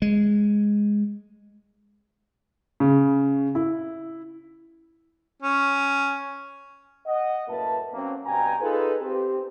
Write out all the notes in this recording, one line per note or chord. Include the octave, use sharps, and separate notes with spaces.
G#3
C#3
E4
C#4
D#5 F#5
F#2 A2 A#3 B4 E5 A5
F#3 A#3 C4 C#4
G2 B2 G5 G#5 A#5
D#4 F4 G#4 A4 B4
C4 G4